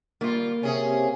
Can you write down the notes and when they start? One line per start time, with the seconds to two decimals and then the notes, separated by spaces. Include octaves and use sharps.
0.21 D3 G3 A#3 F4
0.63 C3 C#4 G#4